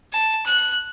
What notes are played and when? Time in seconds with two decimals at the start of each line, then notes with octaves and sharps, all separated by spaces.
0.13 A5
0.46 F#6